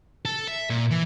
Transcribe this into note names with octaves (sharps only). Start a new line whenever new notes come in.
A4
E5
A#2
E3